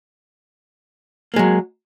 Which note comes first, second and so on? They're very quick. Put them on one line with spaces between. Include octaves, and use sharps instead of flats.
A#3 G#3 F#3